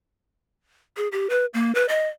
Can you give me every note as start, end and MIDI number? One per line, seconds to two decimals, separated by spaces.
0.97 1.08 68
1.12 1.27 67
1.30 1.46 71
1.54 1.72 58
1.75 1.86 71
1.89 2.07 75